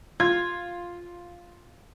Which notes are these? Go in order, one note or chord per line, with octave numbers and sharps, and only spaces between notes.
F4 G#6